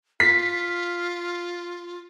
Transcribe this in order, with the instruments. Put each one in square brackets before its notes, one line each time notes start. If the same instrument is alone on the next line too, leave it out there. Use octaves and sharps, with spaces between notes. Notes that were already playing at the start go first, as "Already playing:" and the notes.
[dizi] F4 [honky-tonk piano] B6 C7